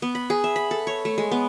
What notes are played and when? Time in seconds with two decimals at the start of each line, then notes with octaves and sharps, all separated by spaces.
0.02 B3
0.15 B5
0.30 G#4
0.44 E5
0.56 B5
0.71 A4
0.87 C#5
1.05 A3
1.18 G#3
1.31 B3